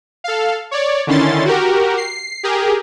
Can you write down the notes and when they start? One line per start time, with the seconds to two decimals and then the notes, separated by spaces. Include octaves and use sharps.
0.24 A4 F5
0.71 C#5 D5
1.07 D3 D#3 C#4 E4 C6 A6
1.45 F#4 G4 A#4
1.97 C7
2.43 G4 G#4 A#4